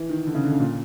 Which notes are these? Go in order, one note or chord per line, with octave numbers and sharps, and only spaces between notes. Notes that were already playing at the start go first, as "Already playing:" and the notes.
Already playing: E3
D#3
D3
C#3
D3
C#3
A#2